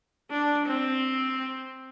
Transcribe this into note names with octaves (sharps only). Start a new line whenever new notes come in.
D4
C4